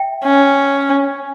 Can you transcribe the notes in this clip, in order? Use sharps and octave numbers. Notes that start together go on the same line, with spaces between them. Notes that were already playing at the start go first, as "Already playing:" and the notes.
Already playing: E5 G5
C#4